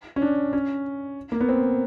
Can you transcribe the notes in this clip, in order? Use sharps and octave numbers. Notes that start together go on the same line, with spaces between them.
C#4
D4
C#4
A#3
B3
C4